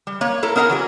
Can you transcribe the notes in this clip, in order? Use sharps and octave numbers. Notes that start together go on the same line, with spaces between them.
G3
A#3 C#5
E4 A4 A#4
B3 D4 A#4 F5 F#5 G#5
E3 F#3 G#4